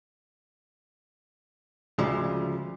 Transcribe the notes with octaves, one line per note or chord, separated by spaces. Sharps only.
D2 C#3 F3 G#3